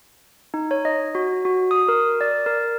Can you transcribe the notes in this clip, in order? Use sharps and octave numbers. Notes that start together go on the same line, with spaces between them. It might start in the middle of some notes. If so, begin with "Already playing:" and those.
D#4
C#5
D#5
F#4
F#4
D#6
A#4
D5
A#4